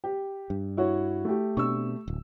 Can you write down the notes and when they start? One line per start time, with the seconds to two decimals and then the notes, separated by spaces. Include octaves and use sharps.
0.04 G4
0.50 G2
0.77 E4 F#4 C#5
1.25 A3 G4
1.57 B2 C4 D4 C#6 E6
2.08 D1